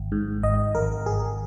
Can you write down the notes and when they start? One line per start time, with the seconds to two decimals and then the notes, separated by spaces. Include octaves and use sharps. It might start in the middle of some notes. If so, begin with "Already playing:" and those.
Already playing: G#1
0.12 G#2
0.43 G#1 D#5
0.75 G#1 A#4
1.06 G#1 G#4